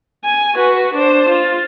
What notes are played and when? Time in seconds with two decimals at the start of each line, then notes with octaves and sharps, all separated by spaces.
0.24 G#5
0.55 F#4 B4
0.94 D4 C5
1.29 F4